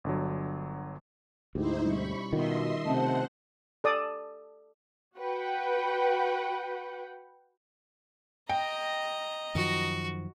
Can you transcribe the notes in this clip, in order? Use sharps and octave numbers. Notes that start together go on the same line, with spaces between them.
G1 D3 F#3
D2 G#2 D#4 E4 G4 C5
B2 G3 C#4 B5 C#6
B2 D#3 E4 F4 G4 D#5 E5 C6
C3 A3 C4 C#4 C5 F#5 A5
A4 D5 D#6
F#4 B4 F#5 G5
D#5 G5 A#5
F#2 D#3 F3 F#4